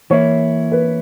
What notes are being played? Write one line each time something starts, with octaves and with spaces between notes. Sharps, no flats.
E3 A#3 E4 C#5
B4